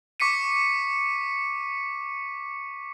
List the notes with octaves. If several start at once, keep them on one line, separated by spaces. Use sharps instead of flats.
C#6 D6 B6 C#7 D#7